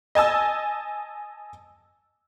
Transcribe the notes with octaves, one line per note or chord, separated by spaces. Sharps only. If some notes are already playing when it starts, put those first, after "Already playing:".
D#5 G#5 A5 E6